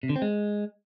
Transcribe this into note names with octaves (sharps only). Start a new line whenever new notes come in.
C3
D3
C4
G#3